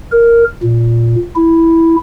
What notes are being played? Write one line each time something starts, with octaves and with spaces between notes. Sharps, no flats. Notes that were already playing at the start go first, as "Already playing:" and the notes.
A#4
A#2
E4